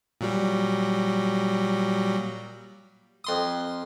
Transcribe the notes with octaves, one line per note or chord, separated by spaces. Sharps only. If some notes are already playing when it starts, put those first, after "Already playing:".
A#2 F#3 G3
F2 C6 D#6